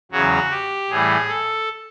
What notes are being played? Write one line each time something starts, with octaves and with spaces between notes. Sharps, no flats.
E2 C#3 F#3 F#4
G4
A2 E3 G3 G#4
A4